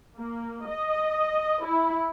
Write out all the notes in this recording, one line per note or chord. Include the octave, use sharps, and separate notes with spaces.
A#3
D#5
E4